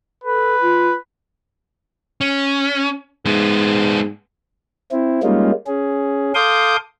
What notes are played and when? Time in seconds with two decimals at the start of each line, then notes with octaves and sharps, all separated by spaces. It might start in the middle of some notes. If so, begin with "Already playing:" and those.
0.24 A4 B4
0.62 F4
2.21 C#4
3.26 G#2 G#3 B3
4.92 C4 E4
5.23 G3 G#3 A#3 C#4 D#4 F4
5.67 C#4 G#4
6.35 A4 F5 C6 D6 D#6 G6